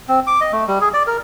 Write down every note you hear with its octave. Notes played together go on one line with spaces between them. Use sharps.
C4
D6
D#5
A3
G3
G#4
D5
A#4